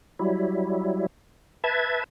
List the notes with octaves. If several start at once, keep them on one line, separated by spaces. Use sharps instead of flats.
F#3 G3 E4
B4 E5 A5 G#6